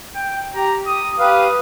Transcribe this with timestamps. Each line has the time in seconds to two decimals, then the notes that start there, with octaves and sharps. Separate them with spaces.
0.15 G5
0.55 G4 A#5
0.86 D#6
1.19 G4 B4 F5 D#6